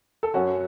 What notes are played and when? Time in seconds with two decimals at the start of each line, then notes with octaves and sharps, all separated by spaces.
0.23 A4
0.34 F#2 F#3 C#4 F#4